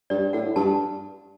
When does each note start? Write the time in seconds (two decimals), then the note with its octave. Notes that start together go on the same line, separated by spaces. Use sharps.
0.10 G2 D5
0.33 A2 F#5
0.56 G2 A5